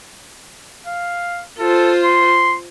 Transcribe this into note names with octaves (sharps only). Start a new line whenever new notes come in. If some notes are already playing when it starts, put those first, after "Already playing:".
F5
F4 A4 C5
C6